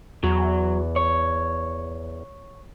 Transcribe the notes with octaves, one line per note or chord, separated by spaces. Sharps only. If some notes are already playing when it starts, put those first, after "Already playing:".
E2 F#3
C#5